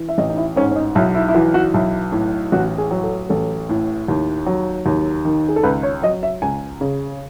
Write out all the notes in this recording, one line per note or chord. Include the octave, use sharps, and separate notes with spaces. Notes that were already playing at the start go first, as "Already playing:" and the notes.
Already playing: E3
E5
A1 D#5
D#4
E4
G#2 C#4
C#4
D#4
B1 E4
E4
E4
E3 F#4
F#4
B1 E4
A2
A1 F#4
G#4
F#3
A4
A1 A4
A2
D#2
F#3
D#2
D#3
G#4
A4
C#2 B4
C#5
F#3 D#5
E5
C#2 G#5
C#3